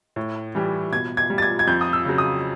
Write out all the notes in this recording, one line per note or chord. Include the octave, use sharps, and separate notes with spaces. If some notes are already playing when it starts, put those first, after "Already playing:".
A2
E3 G3
B2 G#6
G#6
G3
A6
G#6
G#6
F2 G6
D#6
E6
C#3 F#3
D#6